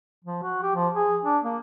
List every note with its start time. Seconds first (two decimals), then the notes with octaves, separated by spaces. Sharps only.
0.24 F3
0.43 F#4
0.62 G4
0.75 F3
0.94 G#4
1.25 D4
1.43 A#3